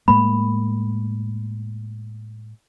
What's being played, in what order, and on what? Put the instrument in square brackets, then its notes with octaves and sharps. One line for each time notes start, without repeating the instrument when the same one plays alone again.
[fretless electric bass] A2 G#3 A#3 [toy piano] B5